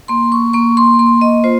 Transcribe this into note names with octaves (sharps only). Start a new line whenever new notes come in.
A#3 C6
C#6
A#3 C#6
C6
A#3 C6
D#5
F4 C5